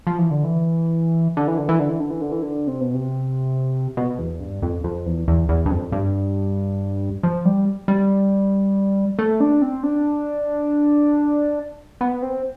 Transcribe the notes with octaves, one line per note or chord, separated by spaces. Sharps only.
F3
E3
D3
E3
D3
E3
D3
E3
D3
E3
D3
E3
D3
E3
D3
C3
B2
C3
B2
E2
G2
F2
F2
E2
E2
E2
G2
F2
G2
F3
G3
G3
A3
D4
C4
D4
B3
C4